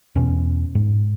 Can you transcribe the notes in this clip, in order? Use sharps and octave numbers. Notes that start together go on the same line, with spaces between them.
E2 B2 C#4
G#2